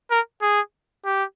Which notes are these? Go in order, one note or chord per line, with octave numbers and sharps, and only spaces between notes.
A#4
G#4
G4